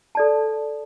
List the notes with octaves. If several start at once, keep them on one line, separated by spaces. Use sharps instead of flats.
A4 D5 A5